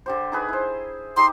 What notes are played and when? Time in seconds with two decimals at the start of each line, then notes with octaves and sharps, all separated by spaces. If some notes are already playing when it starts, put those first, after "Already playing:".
0.06 D3 G4 C5
0.32 D#4 G#4 B4
0.49 E4 C5
1.17 D#4 G4 C6